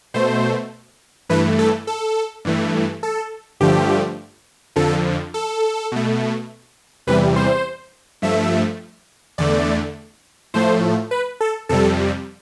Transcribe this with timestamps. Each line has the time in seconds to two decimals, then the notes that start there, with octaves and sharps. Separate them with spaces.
0.14 B2 A3 C5
1.29 G2 E3 A3 B4
1.59 A4
1.87 A4
2.45 G2 E3 A3
3.03 A4
3.60 G2 D3 F3 A3 G4
4.76 F2 D3 F3 A4
5.34 A4
5.92 B2 A3
7.07 E2 C3 E3 G3 B4
7.36 C5
8.22 G2 F3 A3 E5
9.38 E2 D3 A3 D5
10.54 A2 F3 A3 C5
11.11 B4
11.41 A4
11.69 F2 C3 G3 A4